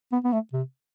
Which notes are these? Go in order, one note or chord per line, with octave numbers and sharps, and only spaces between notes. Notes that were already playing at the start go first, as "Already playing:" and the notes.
B3
B3
A3
C3